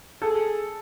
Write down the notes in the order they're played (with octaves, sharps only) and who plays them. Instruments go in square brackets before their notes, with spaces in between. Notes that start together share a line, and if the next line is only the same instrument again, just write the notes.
[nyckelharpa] G#4 [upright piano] A4